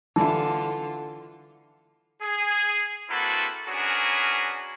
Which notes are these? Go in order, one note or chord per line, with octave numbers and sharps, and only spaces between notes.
D3 E3 D4 E4 F4 A5
G#4
A#3 C4 E4 F#4 A4 B4
C#4 D4 F#4 G#4 A#4 B4